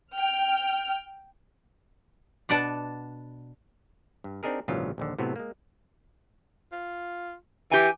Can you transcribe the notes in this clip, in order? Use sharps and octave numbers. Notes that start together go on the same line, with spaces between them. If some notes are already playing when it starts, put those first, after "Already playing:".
G5 F6
B2 D4 B4 D5 F#5 A5
G2
C4 D4 D#4 G#4 A#4
A#1 G#2 C#3 E3 F#3 F4
A#1 D#2 D3
A2 C3 F#3 B3
G#3 A#3
F4
E3 G4 G#5